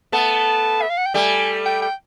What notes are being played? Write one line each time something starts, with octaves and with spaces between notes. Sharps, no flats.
A3 B3 A5
E5
F5
F#5
G5
G3 A3 G#5
G5
G5